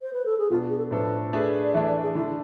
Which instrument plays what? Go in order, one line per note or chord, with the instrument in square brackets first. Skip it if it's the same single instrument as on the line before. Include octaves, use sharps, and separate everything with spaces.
[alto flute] C5
B4
A4
G#4
[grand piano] B2 B3 D4 [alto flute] F4
[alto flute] G#4
A4
[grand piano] A2 F3 A3 D4 A4 [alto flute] B4
[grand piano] A3 D4 G#4 B4
[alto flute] D5
[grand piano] E3 A3 D4 [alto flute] E5
[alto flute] D5
G#4
[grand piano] D3 A3 D4 [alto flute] E4